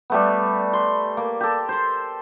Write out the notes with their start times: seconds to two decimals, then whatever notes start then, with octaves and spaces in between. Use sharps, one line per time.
0.10 G3 A3 B3
0.73 C6
1.17 A#3
1.41 G4 A4
1.69 C5 C6